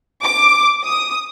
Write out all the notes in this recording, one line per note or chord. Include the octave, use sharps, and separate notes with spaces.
D6
D#6